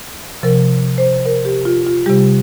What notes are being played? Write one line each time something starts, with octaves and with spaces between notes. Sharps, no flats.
C3 F3 A#4
C5
A#4
G4
F4
F4
C3 G3 G4